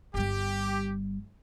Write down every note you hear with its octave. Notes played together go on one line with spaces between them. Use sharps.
G1 G3 G4